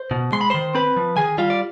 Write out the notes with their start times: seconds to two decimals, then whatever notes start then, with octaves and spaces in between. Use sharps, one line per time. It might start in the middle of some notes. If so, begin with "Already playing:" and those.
Already playing: C5
0.11 B2
0.32 G#3 C6
0.41 B5
0.50 D#3 C5 C6
0.75 C4 B4 B5
0.97 F3
1.17 D#3 G#4 G#5
1.38 G3 F4 F5
1.50 D5